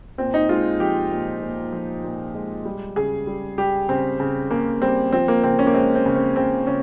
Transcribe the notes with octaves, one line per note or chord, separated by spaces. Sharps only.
A#2 C4
D#4
G#3 F4
F3 G4
A#2
A#2
F3
A#2
G#3
G3
C#3 G#4
G3
G3 G4
C#3 C4
C#3
C#3 A#3
G3 C4
F3 C4
A#3
C#3 C4
C#4
A#3
G#3 C4
C4
C#3
C4
C#3 C4
C#3 C#4